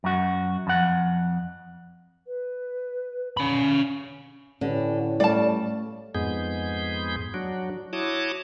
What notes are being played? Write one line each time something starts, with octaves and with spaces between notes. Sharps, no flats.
F#2 F#4
F2 F#5
B4
C#4 B5
A2 D3 C#4 G4 B4
G3 A3 C#5 D5 F5 A5
F2 G#2 G#3 B3 G#4 G6
F#3 D4 F#4
E4 F#4 C#5 A5 D6 D#6